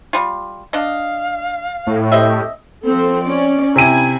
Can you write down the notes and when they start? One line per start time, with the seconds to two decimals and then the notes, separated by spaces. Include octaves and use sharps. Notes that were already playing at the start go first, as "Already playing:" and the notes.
0.13 G3 F4
0.73 D4 D#5 F5
1.87 A2
2.12 C4 G4 D#5 E5
2.84 F3 C4 A4
3.24 C#4 D5
3.76 C3 E4 G#5 D#7